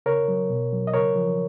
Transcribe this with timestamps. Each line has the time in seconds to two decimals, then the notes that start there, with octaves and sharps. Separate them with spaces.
0.06 C#3 A#4 C#5
0.28 F#3
0.50 B2
0.72 F#3
0.87 D#5
0.94 C#3 A#4 C#5
1.16 F3